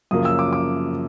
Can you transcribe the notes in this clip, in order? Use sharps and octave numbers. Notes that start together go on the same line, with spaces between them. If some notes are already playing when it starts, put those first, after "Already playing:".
F#2 C#3 F3 A#3 D#6
E6
D6
D6